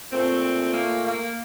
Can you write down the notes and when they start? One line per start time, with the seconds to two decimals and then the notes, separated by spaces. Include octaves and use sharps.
0.11 A#2 A3 C4
0.73 A#3
1.05 A#3